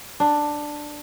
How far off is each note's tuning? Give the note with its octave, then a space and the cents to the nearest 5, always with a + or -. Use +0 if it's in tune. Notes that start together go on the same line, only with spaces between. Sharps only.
D4 +10